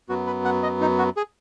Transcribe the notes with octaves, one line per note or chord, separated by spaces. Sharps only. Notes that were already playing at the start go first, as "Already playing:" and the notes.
F#2 F#3 B3 F#4
B4
F#5
D#5
D#4
F#4
G#4